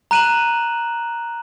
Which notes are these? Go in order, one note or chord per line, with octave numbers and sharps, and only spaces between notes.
A#5 F#6 D#7 E7 F#7